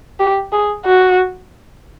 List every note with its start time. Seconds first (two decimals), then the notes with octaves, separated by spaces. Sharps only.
0.20 G4
0.52 G#4
0.86 F#4